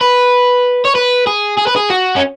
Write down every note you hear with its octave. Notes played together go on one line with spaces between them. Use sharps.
B4
C#5
B4
G#4
G#4
B4
G#4
F#4
C#4